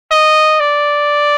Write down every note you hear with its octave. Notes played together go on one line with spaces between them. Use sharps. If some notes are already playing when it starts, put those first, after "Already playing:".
D#5
D5